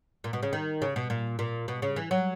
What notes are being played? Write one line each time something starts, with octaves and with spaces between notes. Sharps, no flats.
A#2
B2
C#3
D#3
C#3
B2
A#2
A#2
B2
C#3
E3
F#3